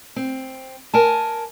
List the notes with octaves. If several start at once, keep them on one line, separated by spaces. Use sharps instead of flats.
C4
A#4 G#5 A5